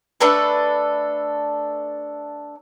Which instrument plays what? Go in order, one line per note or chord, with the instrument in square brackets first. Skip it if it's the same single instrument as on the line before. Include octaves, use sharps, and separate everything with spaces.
[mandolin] A3 D4 A4 B4